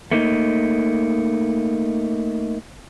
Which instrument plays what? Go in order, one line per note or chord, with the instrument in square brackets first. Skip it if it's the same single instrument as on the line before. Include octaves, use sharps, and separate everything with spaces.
[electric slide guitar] A3 A#3 D#4